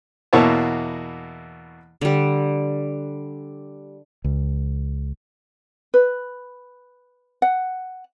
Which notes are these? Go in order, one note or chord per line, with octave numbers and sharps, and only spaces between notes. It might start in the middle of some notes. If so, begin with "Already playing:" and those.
E2 B2 A#3 E4 C#5 A5
D3 G3
C#2
B4
F#5